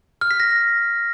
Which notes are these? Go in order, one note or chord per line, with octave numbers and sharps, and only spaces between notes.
F6
B6
A#6